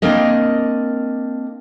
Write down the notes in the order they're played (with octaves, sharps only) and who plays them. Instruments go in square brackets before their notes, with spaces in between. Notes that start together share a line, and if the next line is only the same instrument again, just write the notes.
[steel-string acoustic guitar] A#3 C4 D4 A#4 D#5